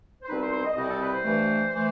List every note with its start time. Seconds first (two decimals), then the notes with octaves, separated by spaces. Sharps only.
0.22 C5
0.28 C2 B2 G3 C4 D#4 B4
0.41 C5
0.51 C5
0.64 D#5
0.75 C2 B2 G3 C4 D#4 D#5
0.88 A4
1.00 B4
1.11 C5
1.24 G2 E3 A3
1.73 E3 A3